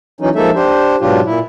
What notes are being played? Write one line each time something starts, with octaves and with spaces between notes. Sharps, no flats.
E3 F#3 C#4 D#4
F3 G#3 A#3 D#4 A4 E5
D4 G4 C5
G#2 B2 F#3 D4 F4 G4
A#2 E4